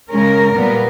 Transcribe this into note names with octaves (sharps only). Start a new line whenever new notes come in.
C#3 G#3 C#4 A#4
A#2 G3 B3